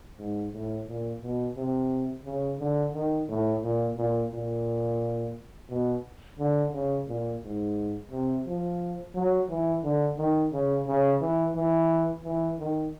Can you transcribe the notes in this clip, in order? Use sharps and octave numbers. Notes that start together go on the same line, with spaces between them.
G#2
A2
A#2
B2
C3
C#3
D3
D#3
A2
A#2
A#2
A#2
B2
D3
C#3
A#2
G#2
C3
F3
F#3
E3
D3
D#3
C#3
C#3
E3
E3
E3
D#3